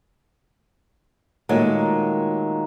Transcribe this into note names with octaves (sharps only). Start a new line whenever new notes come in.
A#2 D#3 F#3 G#3 A3